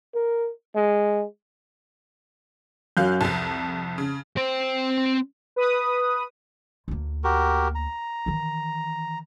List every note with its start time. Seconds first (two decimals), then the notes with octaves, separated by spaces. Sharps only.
0.15 A#4
0.76 G#3
2.97 F#2 F#3 F5 F#6 G6
3.21 C2 F2 A5
3.98 C#3
4.37 C4 C5
5.56 B4 D#6
6.88 D2 A#3
7.24 F#4 G4 A#4
7.75 A#5
8.26 D#3 E3